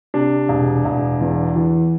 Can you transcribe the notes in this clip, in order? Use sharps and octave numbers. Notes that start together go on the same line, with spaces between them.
C3 D4
E1
E1
E2
E3